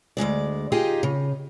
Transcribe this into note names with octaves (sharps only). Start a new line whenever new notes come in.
D2 B2 G#3 D5
D#4 F4 G4 G#4 D#5
C#3